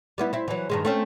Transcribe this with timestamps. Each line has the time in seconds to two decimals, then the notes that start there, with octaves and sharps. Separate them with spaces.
0.18 G3 B3 E4
0.33 C4 E4
0.48 E3 F#3
0.70 G2 D#3 G#3
0.85 A3 C4 C#4